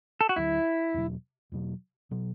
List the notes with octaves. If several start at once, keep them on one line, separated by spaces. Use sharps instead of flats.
A4
F#4
D2 D3 F#3 E4
E2 B2 F#3
E2 B2 F#3
B2 F#3